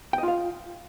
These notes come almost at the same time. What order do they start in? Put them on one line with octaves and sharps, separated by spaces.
G5 D#5 F4 F5